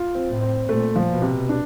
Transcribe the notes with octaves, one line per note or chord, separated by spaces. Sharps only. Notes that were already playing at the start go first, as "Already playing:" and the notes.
Already playing: F4
C4
A2
C4
A#2 A3
F3
B2
C3
D4